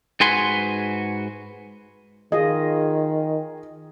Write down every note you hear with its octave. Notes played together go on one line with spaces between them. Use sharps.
G#2 F#4 B4 G#5 C6
D#3 F4 G#4 D#5